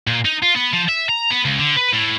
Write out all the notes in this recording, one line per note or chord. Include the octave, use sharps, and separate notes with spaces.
A#2
D#4
F4
B3
F3
E5
A#5
B3
C#2
D3
B4
A2